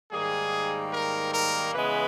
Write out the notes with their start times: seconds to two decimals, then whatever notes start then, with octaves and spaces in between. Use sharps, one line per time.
0.12 G#2 D#3 G3 A#3 G#4
0.93 A#4
1.34 A#4
1.74 C#3 E3 G#3 B3 B4